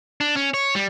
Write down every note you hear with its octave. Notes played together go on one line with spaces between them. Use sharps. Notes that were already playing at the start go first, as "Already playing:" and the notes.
D4
C#4
C#5
G3